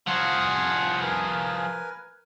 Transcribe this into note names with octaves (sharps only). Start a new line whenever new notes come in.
F3 F4 G#4 F#5
A#4 B4 G#5